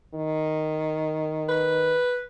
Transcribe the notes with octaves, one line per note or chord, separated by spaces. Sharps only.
D#3
B4